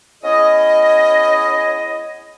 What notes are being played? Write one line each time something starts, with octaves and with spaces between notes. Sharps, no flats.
B3 C#4 E4 G#4 D#5